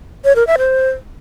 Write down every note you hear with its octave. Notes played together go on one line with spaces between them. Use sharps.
C#5
A#4
E5
C5